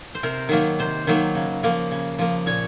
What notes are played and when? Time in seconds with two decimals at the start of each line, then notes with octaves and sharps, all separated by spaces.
0.15 C5
0.23 C3 A#4
0.49 D#3 F#3 A#3
0.79 C3 C5
1.07 D#3 F#3 A#3
1.35 C#3
1.63 F3 A#3
1.91 C#3
2.19 F3 A#3
2.46 A#2 C#5